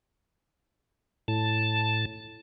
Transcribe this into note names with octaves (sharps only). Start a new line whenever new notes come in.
A2 A5